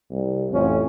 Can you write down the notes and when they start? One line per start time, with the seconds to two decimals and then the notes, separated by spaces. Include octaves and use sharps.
0.11 C2
0.52 A1 F2 C#4